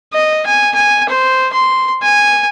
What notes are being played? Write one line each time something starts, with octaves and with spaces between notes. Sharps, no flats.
D#5
G#5
G#5
C5
C6
G#5